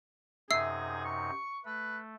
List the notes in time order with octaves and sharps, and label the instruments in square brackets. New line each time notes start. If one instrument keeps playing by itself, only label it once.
[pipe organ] F#2 C3 D#4 [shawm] G#4 [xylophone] E5 E6 C7
[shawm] C#6
[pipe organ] A3 [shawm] B4